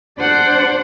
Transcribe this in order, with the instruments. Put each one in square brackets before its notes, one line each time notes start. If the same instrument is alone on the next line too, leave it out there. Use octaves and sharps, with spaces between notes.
[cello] D4 C5 [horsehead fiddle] D5 F#5